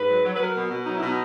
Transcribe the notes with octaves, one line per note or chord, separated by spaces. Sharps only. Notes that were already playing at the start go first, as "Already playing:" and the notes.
Already playing: G#2 B4
F#3
F#3
B4
F#3 A#4
B2
B2
F#3 D#4
B2 E4
D#4